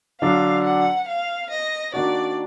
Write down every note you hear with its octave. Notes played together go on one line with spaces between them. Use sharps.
D3 F#3 D4 F5
F#5
F5
D#5
D#3 A#3 D4 F#4 D5